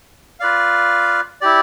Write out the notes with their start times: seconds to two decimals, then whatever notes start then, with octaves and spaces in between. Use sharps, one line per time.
0.40 F4 B4 D5 F5
1.41 E4 G4 D5